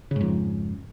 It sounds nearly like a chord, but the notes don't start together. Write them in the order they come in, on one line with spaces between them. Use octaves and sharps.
C#3 G#2 F2